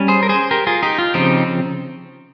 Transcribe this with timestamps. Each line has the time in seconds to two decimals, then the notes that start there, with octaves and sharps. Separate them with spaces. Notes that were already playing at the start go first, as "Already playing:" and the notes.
Already playing: G3 C#4
0.08 G#4 C5
0.23 A#4
0.29 G#4 C5
0.51 G4 A#4
0.67 F4 G#4
0.83 D#4 G4
0.98 F4
1.14 C#3 F3 C4 D#4 G4